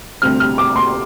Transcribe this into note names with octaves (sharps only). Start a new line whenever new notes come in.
D2 C3 G3 C4 F6
F6
D6
C6